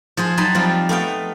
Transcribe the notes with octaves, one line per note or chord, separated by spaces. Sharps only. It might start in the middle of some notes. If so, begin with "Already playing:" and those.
F3 G#4 C5
F#3 D#4 G5 A5 B5 C6
F3 G3 C4 F4
A3 B3 F5 G5